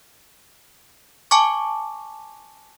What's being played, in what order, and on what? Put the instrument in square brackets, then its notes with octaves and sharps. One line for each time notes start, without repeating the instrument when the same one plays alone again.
[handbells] G#5 A5 C#6 D6